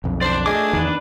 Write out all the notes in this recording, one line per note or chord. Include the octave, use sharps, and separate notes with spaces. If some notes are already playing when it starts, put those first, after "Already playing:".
B1 F2
C5 D5 A5
A3 G#4 D#5 D6
E2 D#3 D4 B4